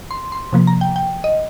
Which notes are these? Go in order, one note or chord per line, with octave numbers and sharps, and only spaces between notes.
C6
C6
C3 F3 A#3
A#5
G5
G5
D#5